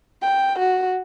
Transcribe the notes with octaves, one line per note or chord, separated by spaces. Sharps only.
G5
F#4